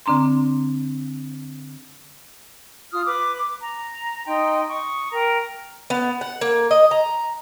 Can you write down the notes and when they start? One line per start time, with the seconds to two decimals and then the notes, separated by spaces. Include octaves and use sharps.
0.06 D3 C4 D4 A#5 C6
2.91 F4 D#6 F6
3.06 B4 D6
3.62 A#5
4.26 D#4 D#5 G5 C6
4.69 C#6 D#6
5.12 A#4 G5 A#5
5.90 B3
6.21 F#5
6.41 A#3
6.71 D#5
6.91 A#5